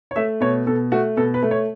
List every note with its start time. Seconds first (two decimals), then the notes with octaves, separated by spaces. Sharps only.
0.11 C#5
0.16 A3 E5
0.41 B2 C#5
0.67 B2 A4
0.92 A3 F#4
1.17 B2 A4
1.34 B4
1.42 A3
1.51 C#5